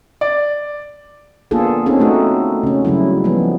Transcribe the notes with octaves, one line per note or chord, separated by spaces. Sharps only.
D5
A#3 B3 D4 F4 G#4 A4
C4 C#4 D#4 G#4 A4
A3 D#4 F#4
C#3 C#4
C#3 F#3 G3 E4
F3 G3 G#3 B3